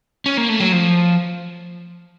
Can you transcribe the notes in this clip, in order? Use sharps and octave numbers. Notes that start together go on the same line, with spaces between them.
C#4
A#3
A3
F#3
F3